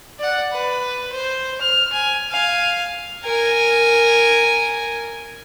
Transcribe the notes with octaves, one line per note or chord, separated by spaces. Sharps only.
D5 F#5
B4
C5
F6
G#5
F5 G#5
A#4 G#5